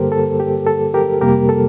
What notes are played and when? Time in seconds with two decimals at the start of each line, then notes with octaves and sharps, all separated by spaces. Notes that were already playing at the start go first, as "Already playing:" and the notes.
Already playing: G2 D3 G3 A#3 G4 A4 A#4 C5
0.12 A4
0.40 G4
0.67 A4
0.94 G4 A#4
1.21 F2 C3 G3 A#3 G4 A#4
1.49 A4